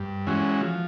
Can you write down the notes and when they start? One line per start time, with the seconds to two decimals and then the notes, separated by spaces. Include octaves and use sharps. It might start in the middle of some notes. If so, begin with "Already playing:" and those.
Already playing: G2
0.27 E3 G#3 C#4 F#4
0.61 F3